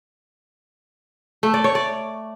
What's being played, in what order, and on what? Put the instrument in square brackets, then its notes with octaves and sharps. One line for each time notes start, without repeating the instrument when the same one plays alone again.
[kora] A3
D5
C#5
D5